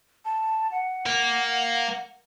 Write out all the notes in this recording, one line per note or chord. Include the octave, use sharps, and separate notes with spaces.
A5
F#5
A#3